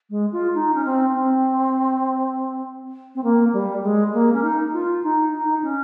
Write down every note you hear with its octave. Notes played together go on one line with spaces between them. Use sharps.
G#3
F4
D#4
C#4
C4
C4
C4
A#3
G3
G#3
A#3
C#4
D#4
F4
D#4
D#4
C#4